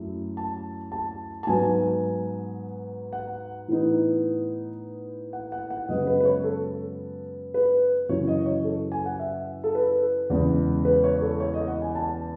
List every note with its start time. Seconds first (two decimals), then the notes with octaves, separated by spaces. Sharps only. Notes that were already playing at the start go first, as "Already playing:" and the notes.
Already playing: F#2 A3 E4
0.37 A5
0.92 A5
1.43 A5
1.47 G#2 F#3 B3 G#5
3.13 F#5
3.68 A2 E3 B3 D#4
5.33 F#5
5.52 F#5
5.70 F#5
5.89 F#2 C#3 G#3 B3 D#5
6.07 B4
6.20 B4
6.25 C#5
6.44 A4
7.54 B4
8.09 F#2 C#3 E3 C#5
8.28 D#5
8.46 C#5
8.64 A4
8.92 G#5
9.06 F#5
9.20 E5
9.64 A4
9.75 B4
10.30 E2 C#3 G#3
10.85 B4
11.04 C#5
11.22 A4
11.40 C#5
11.54 D#5
11.68 F#5
11.82 G#5
11.95 A5